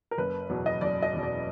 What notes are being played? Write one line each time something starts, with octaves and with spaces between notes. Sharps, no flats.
A#4
F#1 B4
E2 B2 F#3
D#5
F#1 D5
D#5
E2 B2 F#3
D5